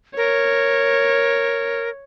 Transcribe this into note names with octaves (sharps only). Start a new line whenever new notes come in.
A#4 C#5